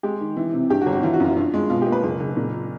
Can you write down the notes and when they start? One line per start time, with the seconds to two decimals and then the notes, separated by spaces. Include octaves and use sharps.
0.03 G#3 G4
0.21 D#3
0.37 E3
0.53 C3
0.70 G2 G4
0.82 F#4
0.86 G1
0.92 F#4
1.03 E3 F4
1.13 F#4
1.20 F#2 F4
1.37 G2 F4
1.54 G#3
1.70 B2 F4
1.82 A#3 G4
1.92 B4
2.03 F#1
2.20 F#1
2.37 A#2